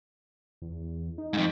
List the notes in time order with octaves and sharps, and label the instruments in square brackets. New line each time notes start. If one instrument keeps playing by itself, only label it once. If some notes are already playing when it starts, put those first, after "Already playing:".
[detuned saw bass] E2
D#4
[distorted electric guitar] F2 G#2